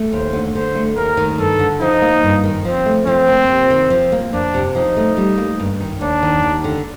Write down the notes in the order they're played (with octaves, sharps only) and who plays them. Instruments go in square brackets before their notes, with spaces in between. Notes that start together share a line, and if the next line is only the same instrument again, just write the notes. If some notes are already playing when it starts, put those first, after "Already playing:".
Already playing: [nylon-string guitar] A3
[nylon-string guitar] D#2 [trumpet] C5
[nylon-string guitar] D3
[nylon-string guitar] D3 [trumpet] C5
[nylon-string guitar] A3
[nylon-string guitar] D#2 [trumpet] A#4
[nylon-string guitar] D#3
[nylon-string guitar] G2 [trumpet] A4
[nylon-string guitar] D3
[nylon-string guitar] F3 [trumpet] D#4
[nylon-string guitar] A#3
G2
D#3
[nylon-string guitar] F3 [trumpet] C4
[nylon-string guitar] A3
[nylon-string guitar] F3 [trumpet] C4
[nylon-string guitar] A#3
C3
D#3
F3
A#3
[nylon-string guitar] F2 [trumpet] D4
[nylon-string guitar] C3
[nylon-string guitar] F3 [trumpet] D#4
[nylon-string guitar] A3
G3
A#3
G2
D#3
[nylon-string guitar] D#2 [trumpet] D4
[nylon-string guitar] D#3
D#2
D3